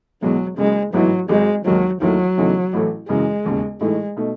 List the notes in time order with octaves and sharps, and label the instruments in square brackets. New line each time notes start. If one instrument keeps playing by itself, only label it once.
[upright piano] E1 E2 B2 G#3 [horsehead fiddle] F#3
[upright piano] F#1 F#2 C#3 [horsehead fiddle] G#3
[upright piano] A1 G#2 E3 B3 E4 [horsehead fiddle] F#3
[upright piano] G#1 G#2 F#3 [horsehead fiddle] G#3
[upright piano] D#2 D#3 G#3 D#4 [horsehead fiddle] F#3
[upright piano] D#2 D#3 A3 E4 [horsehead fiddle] F#3
[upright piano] E2 C#3 E3 A3 D#4
A1 A2 E3 A3
[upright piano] F#2 C#3 E3 [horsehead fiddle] G#3
[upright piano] E1 D#2 C#3
[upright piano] A2 E3 A3 D#4 [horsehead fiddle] G#3
[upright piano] B2 A3 D#4